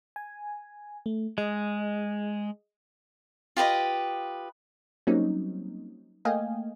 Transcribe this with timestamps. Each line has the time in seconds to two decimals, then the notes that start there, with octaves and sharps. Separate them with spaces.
0.16 G#5
1.06 A3
1.38 G#3 G#4 D#5
3.57 F4 G4 B4 D#5
5.07 F#3 G3 A#3 C4 C#4 D#4
6.25 A3 A#3 D#5 F5 G5 G#5